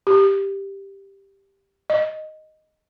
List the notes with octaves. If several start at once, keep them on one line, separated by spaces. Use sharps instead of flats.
G4
D#5